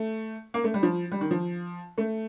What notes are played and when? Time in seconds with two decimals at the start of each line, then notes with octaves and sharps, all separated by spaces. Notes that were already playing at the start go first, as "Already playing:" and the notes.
Already playing: A3
0.54 A#3
0.64 A3
0.74 G3
0.83 F3
1.12 G3
1.21 D#3
1.31 F3
1.98 A3